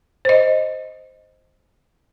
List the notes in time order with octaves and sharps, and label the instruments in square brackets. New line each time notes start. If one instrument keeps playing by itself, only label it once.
[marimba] C5 D#5